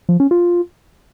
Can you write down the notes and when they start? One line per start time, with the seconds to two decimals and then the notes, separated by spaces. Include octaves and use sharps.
0.09 F3
0.20 C#4
0.31 F4